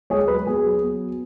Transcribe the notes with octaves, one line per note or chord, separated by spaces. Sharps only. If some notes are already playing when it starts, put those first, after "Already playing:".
G#3 G#4 C#5
F#3 B4
B3 G#4
F#3
B3